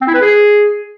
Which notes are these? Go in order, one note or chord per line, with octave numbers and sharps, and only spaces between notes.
C4
E4
B4
G#4